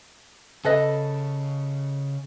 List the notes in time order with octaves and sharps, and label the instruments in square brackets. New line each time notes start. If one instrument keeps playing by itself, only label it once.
[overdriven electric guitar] C#3 [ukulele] A4 B4 D#5